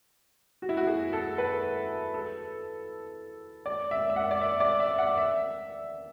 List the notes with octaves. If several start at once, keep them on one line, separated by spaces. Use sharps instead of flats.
F#4
E4
F#4
G#4
A4
B4
A4
D5
E5
E5
F#5
D5
E5
D5
E5
F#5
E5